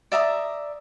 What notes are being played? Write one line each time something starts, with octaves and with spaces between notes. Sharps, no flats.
D5 E5 A#5 D#6